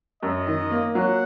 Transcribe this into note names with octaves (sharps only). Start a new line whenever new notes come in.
F#2 D#5
D#3
A#3
F#3 F#5